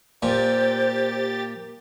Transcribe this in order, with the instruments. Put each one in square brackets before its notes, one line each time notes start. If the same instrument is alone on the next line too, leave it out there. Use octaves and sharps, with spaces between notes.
[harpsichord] A#2 [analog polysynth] G4 A6 [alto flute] C5